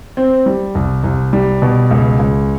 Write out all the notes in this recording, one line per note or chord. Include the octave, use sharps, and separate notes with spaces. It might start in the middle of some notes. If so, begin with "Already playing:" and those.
C4
G3
C2
C2
G3
B2
C#2
C#2